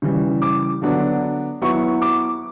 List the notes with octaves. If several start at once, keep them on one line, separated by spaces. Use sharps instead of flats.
C#3 E3 G3
D6
D3 F#3 B3 D4
F#3 B3 E4 C#6
D6